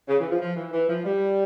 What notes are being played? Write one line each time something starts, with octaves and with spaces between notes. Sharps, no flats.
C#3
E3
F3
F3
E3
E3
F3
G3